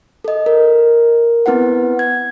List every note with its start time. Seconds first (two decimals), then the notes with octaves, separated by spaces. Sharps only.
0.24 A4 D#5
0.46 A#4
1.46 B3 C4 E4 B4 F#5
1.99 G#6